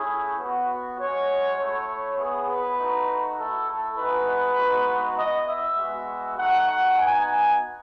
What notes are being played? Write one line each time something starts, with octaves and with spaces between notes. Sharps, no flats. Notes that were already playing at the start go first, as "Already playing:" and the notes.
Already playing: A3 C#4 E4 G#4
B3 F#4
G#3 C#4 F#4 C#5
A3 E4 C#5
B3 E4 G#4
B4
A3 D#4 F#4
A3 E4 A4
A4
G#3 D#4 F#4 B4
G#3 B3 D#4 F#4
B3 E4 D#5
E5
G#3 B3 F#4
A3 D#4 F#4 F#5
B3 D#4 F#4 G#5